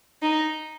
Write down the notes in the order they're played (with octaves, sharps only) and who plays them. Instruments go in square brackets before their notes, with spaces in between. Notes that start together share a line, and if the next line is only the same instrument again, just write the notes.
[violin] D#4